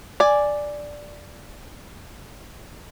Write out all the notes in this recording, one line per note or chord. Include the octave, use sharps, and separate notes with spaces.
D5 G#5